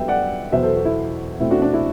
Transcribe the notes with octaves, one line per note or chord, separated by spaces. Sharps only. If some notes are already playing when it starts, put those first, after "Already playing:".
Already playing: G2 F#3 B3 E5 G5
D5 F#5
E2 B2 F#3 B3 C5 E5
A4 C5
F#4
E4
B2 A3 C4 E4
D4 F#4
D4
E4